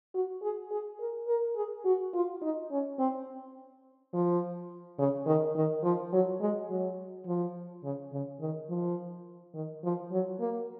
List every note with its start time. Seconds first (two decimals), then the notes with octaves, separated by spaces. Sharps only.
0.15 F#4
0.42 G#4
0.72 G#4
1.00 A#4
1.28 A#4
1.56 G#4
1.85 F#4
2.14 F4
2.42 D#4
2.71 C#4
2.99 C4
4.14 F3
4.99 C#3
5.27 D#3
5.56 D#3
5.84 F3
6.13 F#3
6.41 G#3
6.70 F#3
7.27 F3
7.84 C#3
8.13 C#3
8.41 D#3
8.69 F3
9.55 D#3
9.84 F3
10.12 F#3
10.40 A#3